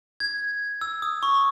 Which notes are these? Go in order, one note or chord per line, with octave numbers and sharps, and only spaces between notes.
G#6
E6
D#6
C#6